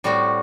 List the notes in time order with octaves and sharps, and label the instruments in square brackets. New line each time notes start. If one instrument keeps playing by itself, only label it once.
[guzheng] A2 G3 C4 F#4